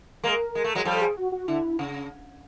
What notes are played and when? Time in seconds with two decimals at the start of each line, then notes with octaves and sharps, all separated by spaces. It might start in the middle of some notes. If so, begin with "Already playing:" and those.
0.24 G#3 A#3 A#4
0.55 G#3
0.64 A3
0.75 F#3 G#3
0.85 F3 G3 A4
1.01 G#4
1.17 F#4
1.32 F#4
1.48 D3 E4
1.79 C#3